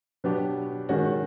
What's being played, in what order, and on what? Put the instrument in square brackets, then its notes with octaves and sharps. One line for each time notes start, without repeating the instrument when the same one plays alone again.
[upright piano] B2 F#3 B3 D4 G4
D#3 G#3 C#4 F#4